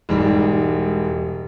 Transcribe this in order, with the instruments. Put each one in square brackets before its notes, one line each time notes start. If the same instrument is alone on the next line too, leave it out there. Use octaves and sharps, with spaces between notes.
[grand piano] E1 G#2 G3